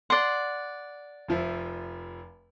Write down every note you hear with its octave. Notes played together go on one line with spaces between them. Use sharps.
D5 F#5 C6
F1 F3 E5